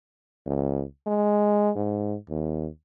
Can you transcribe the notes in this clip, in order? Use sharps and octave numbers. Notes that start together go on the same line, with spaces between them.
C#2
G#3
G#2
D#2